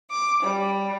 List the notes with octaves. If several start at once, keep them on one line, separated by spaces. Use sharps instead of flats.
D6
G3